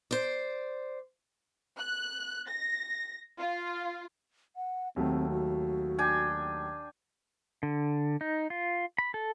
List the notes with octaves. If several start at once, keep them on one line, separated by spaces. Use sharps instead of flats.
C5 D5
F#6
A#6
F4
F#5
D#2 F#3 A3 C4
F#4
D4 G5 G#5
D3
D#4
F4
B5
A4